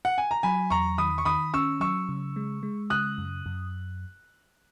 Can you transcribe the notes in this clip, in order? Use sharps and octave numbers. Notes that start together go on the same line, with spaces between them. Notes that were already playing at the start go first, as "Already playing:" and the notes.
F#5
G#5
A#5
F#3 G#5 B5
E2 A#5 C#6
D#3 B5 D#6
C#6
D#3 B5 D#6
C#4 C#6 E6
F#3 C#6 E6
C#3
G#3
G#3
C#3 D#6 F#6
F#2
F#2